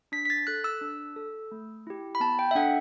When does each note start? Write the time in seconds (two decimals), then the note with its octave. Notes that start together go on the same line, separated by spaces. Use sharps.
0.12 D4 B6
0.25 B6
0.30 A6
0.47 A4 F#6
0.64 E6
0.81 D4
1.16 A4
1.52 A3
1.87 E4 G4
2.15 B5
2.20 B3 A5
2.39 G5
2.51 E5
2.55 D4 A4 F#5